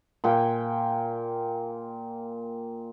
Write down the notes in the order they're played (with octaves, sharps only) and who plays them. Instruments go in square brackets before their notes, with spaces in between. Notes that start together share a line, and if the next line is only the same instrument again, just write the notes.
[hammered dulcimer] A#2 G5 G#5